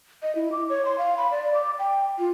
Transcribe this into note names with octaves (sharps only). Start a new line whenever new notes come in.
D#5
E4
D6
C#5
C6
F5
B5
D5
D6
G5
F4